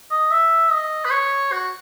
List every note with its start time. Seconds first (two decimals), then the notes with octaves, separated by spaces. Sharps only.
0.11 D#5
0.31 E5
0.71 D#5
1.05 B4
1.11 C#5
1.52 F#4